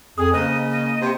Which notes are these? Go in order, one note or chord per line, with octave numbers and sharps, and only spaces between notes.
F2 G#4 D#6
C#3 A#3 C5 D#5 A#5
D#5
C3 F#4 G5